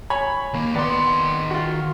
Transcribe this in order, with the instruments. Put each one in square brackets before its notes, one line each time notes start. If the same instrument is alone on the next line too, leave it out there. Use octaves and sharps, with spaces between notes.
[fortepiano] C#5 G#5 B5
[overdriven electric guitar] D#2 A#3
[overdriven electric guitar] D#3 C6 [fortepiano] B3 D5
[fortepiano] F4 F#4